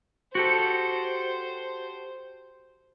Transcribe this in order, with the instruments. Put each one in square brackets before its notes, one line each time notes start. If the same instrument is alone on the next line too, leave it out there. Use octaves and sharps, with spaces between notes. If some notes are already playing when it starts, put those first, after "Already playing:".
[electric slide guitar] F#4 G4 A4 [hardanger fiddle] C5